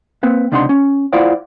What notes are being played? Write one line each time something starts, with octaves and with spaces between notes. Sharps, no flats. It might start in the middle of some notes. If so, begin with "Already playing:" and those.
A#3 C4 B4
C#2 C3 D4 D#4 F#5 C6
C#4
E4 F4 C5 D5 F5 F#5